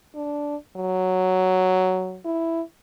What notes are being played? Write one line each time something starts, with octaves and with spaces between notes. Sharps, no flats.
D4
F#3
E4